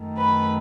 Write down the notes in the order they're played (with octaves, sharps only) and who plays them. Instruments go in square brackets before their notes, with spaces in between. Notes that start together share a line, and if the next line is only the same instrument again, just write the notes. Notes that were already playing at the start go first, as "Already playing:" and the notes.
Already playing: [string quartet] F#2 D#3 A3
B4 B5